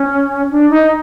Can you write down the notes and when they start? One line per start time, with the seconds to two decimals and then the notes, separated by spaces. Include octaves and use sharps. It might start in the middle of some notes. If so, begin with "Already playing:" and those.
Already playing: C#4
0.51 D4
0.70 D#4